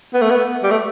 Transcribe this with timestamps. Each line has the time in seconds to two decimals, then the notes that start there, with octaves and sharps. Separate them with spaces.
0.14 B3
0.22 A3
0.30 B3
0.63 G3
0.71 A3